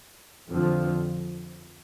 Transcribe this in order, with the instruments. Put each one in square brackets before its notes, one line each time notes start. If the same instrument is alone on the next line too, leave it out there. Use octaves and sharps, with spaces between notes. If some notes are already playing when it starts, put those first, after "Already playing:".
[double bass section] F2 D3 F3